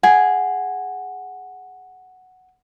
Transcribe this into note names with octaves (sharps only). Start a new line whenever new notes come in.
G#4 F#5